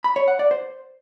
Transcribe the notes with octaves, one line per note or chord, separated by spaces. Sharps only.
B5
C#5
F#5
D5
C5